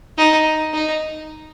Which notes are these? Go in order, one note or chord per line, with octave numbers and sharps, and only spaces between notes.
D#4
D#4